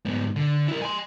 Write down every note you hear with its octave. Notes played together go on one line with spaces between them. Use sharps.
G#2 B3
D3
E4 A#4
G#5 C6